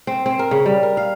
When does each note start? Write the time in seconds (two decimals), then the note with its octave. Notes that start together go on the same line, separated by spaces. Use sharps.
0.07 C4
0.26 C4
0.39 A#4
0.51 C#3
0.66 G3
0.83 A#4
0.97 F5